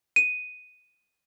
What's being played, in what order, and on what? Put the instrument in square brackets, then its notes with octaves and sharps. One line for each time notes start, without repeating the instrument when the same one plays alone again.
[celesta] D#7